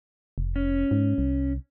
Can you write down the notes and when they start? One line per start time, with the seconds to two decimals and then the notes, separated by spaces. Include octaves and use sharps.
0.38 F1
0.56 C#4
0.91 G#2
1.18 C2